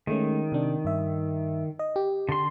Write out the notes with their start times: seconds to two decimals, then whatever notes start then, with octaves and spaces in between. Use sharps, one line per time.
0.07 D#3 G#3 A3 C#4
0.52 C3 D4
0.85 G2 E5
1.79 D#5
1.96 G4
2.29 D3 C6